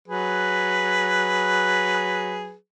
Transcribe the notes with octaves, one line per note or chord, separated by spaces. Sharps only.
F#3 G#4 B4